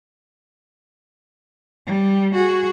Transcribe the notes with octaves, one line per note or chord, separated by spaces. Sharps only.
G3
F#4 G#4